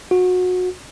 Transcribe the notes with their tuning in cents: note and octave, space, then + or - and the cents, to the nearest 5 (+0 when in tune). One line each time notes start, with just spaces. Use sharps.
F#4 -25